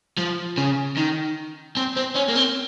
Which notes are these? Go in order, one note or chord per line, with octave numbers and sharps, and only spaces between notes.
F3
C#3
D#3
C4
C4
C#4
A#3
C4